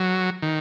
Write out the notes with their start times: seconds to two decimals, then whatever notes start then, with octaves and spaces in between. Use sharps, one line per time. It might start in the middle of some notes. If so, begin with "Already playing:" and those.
Already playing: F#3
0.43 D#3